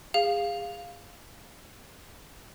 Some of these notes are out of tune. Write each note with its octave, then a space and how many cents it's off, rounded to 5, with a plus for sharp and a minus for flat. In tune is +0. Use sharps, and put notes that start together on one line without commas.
G#4 -30 F5 +0